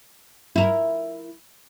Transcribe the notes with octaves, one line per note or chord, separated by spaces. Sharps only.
E4 A#4